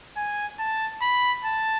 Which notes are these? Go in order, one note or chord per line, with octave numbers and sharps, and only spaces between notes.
G#5
A5
B5
A5